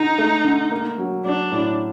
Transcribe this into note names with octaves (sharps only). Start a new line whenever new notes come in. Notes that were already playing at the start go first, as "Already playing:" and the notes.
Already playing: D3 D#4
A3
D3
A#3
F#3
F#3 D4
A2